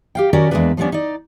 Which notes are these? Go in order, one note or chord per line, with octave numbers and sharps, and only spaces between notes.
G4 F5 G5
D#3 C#4 F#4 G4 A#4 D5
E2 F3 G#3 A#3 D4 B4
F3 G3 A#3 B3 C#4 D4
D#4 D5